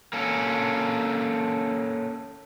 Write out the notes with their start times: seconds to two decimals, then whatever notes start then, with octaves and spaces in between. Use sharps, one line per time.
0.13 A#3 C#4 A4